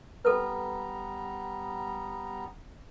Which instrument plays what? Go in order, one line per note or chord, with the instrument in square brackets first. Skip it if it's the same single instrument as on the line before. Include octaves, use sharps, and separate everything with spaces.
[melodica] G3 B3 A#5 [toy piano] A4 B4